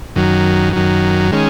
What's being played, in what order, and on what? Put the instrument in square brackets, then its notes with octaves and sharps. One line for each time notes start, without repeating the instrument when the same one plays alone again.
[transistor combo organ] F#2 D#3 F#3
F#2 D#3 F#3
D#3 G#3 C#4